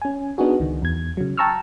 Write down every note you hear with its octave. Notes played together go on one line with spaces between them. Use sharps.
C#4 G#5
B3 D4 D#4 F#4 G#4
C#2 D#3
E2 G#6
C#3 F#3
G5 A5 A#5 C#6 E6 F6